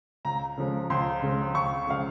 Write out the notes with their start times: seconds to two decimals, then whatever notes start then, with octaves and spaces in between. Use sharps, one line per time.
0.25 C#2 A#5
0.57 C#3 F3 G#3
0.90 C#2 C6
1.22 C#3 F3 G#3
1.55 C#2 C#6
1.87 C#3 F3 G#3 F5